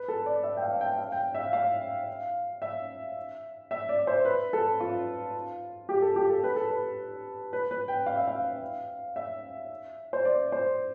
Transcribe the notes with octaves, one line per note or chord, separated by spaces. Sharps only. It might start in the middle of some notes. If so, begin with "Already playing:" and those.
Already playing: B4
A4
D5
E5
G5
F5
G5
F5
G5
E5
F5
F5
E5
E5
D5
C5
B4
A4
F4
G4
A4
G4
A4
B4
A4
B4
B4
B4
G5
F5
E5
F5
E5
C5
D5
C5